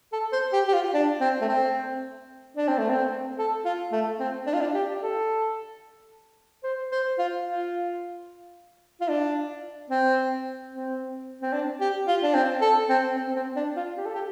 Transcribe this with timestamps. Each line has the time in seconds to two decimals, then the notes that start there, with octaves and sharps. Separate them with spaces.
0.13 A4
0.33 C5
0.53 G4
0.68 G4
0.74 F4
0.94 D4
1.20 C4
1.41 A3
1.49 C4
2.57 D4
2.68 C4
2.78 A3
2.89 C4
3.38 A4
3.65 F4
3.92 A3
4.20 C4
4.46 D4
4.53 F4
4.61 D4
4.74 G4
5.01 A4
6.64 C5
6.92 C5
7.18 F4
7.45 F4
9.00 F4
9.08 D4
9.90 C4
10.71 C4
11.42 C4
11.53 D4
11.81 G4
12.07 F4
12.23 D4
12.34 C4
12.61 A4
12.89 C4
13.16 C4
13.36 C4
13.56 D4
13.77 F4
13.97 G4
14.06 A4
14.15 G4